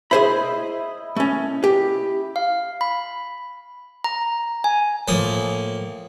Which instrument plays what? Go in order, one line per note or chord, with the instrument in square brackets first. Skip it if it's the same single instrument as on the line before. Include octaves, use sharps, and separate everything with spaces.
[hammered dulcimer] E4 D#5 [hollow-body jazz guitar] G#4 C5 B5
[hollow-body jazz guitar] A3 C#4
G4
[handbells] F5
B5
A#5
G#5
[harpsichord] A2 F3 A#3 D#6